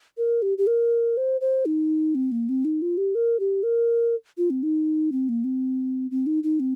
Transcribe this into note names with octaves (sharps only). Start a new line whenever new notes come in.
A#4
G4
G4
A#4
C5
C5
D#4
C4
A#3
C4
D#4
F4
G4
A#4
G4
A#4
F4
C4
D#4
C4
A#3
C4
C4
D#4
D#4
C4